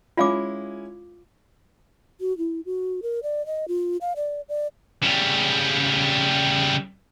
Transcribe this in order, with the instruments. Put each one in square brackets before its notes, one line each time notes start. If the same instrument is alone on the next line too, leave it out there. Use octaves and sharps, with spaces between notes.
[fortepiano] G#3 C#4 E4 [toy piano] F4 F5 D6
[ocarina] F#4
E4
F#4
A#4
D5
D#5
F4
F5
D5
D5
[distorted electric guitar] C#3 G3